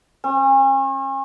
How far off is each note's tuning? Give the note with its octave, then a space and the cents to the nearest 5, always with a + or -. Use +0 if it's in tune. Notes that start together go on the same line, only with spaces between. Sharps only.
C#4 -40